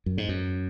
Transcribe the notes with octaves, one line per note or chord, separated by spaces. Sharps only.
F#2
G#2
F#2